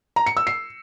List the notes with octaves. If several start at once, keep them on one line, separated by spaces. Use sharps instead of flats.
A#5
C#7
E6
C7